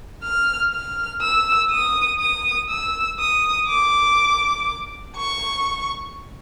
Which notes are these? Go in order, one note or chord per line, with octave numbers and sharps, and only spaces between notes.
F6
F6
E6
D#6
D#6
E6
D#6
D6
C#6